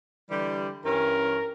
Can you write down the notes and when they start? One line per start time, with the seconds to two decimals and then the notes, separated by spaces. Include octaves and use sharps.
0.30 D3 E3 G3
0.85 G2 E3 C#4 A#4